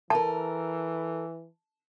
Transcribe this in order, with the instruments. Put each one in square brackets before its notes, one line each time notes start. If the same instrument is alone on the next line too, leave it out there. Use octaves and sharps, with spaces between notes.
[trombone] E3 [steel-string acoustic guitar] A4 A#4 [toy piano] A5